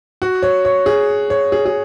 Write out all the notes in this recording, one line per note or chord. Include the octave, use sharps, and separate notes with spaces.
F#4
C#5
C#5
G#4
C#5
G#4
G#4